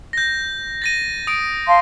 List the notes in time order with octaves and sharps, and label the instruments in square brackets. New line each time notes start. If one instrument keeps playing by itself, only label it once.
[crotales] G6 A#6
A6 A#6 D#7
D#6 D7
[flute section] F5 A5 C6